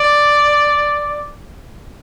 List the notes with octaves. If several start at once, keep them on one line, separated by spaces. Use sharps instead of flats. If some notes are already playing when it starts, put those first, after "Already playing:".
Already playing: D5